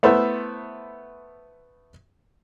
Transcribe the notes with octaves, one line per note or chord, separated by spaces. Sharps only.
A3 B3 E4 C5 E5